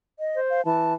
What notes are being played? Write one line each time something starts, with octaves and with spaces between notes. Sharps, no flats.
D#5
C5
F5
E3 A5